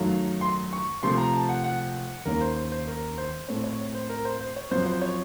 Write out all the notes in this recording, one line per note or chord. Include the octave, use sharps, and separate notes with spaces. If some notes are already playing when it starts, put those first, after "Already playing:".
Already playing: F#2 D#3 F#3 A3 F5
C6
C#6
C3 F3 A3 C6
A#5
A5
F#5
F#5
D#2 D#3 A#3 C#4 A#4
C5
C5
C5
A#4
C5
A2 A3 C4 C#5
C#5
C5
A#4
C5
C5
C#5
F#2 F3 C4 C5
C5
C#5